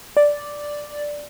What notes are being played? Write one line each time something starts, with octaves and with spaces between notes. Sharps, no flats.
D5